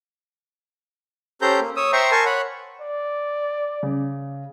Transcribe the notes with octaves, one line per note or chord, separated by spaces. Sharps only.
C#4 G4 A4 C5 A#5 G6
A#3
C#5 D#6 E6
C5 E5 G5 A#5 C6 C#6
A#4 G#5 A5 C6 C#6
C#5 F#5 B5
D5
C#3